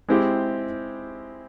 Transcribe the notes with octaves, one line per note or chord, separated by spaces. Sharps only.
G#3 C4 E4 G4